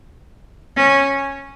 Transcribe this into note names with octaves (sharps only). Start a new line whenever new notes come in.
C#4